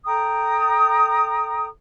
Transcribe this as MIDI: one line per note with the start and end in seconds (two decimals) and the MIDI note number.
0.04 1.66 69
0.04 1.66 79
0.04 1.66 82
0.04 1.66 87